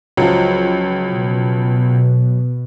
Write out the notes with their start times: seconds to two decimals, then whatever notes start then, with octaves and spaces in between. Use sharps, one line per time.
0.17 C#2 F3 F#3
1.12 B2